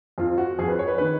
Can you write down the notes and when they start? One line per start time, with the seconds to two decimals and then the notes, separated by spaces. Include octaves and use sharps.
0.18 F2 F3 F4
0.38 F#4
0.59 F2 F3 G#4
0.68 B4
0.79 C#5
0.88 B4
0.98 D#3 B4